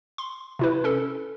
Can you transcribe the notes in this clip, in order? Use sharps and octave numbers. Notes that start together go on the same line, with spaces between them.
C6
C3 E4 B4
C#4 A4